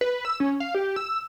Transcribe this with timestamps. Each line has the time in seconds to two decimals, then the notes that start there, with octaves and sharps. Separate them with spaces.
0.01 B4
0.25 E6
0.40 C#4
0.60 F5
0.75 G4
0.96 E6